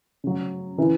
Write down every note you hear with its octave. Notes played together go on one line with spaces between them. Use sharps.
C#3 F#3
C#3 E3